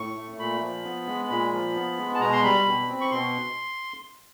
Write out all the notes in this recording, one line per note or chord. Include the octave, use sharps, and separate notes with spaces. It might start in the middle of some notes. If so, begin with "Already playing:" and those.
Already playing: A2 C#6
A3
A#2 B5
F3
B3
G#3
A#2 B5
F3
B3
G#3
A5
B2 A#5
C6
G3 B5
B2
C4
C#6
B2 C6